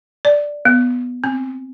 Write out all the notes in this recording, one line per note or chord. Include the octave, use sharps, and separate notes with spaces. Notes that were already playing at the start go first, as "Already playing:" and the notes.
D5
B3
C4